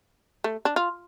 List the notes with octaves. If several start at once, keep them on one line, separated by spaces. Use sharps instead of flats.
A3
D4
F4